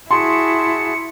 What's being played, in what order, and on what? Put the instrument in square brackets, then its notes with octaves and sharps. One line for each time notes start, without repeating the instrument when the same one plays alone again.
[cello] E4 [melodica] F#4 G#4 A5 [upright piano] C6 [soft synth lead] C#7